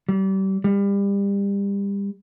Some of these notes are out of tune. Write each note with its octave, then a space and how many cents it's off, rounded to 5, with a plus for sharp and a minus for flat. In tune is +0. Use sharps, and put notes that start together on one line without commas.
G3 -30
G3 +30